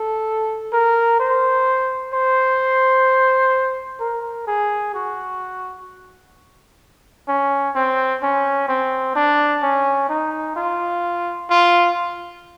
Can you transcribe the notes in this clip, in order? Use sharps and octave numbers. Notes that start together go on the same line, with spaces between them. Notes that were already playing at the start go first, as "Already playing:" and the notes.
Already playing: A4
A#4
C5
C5
A#4
G#4
F#4
C#4
C4
C#4
C4
D4
C#4
D#4
F4
F4